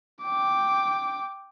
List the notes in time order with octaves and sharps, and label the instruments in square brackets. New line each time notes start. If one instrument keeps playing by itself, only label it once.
[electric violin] G5 D6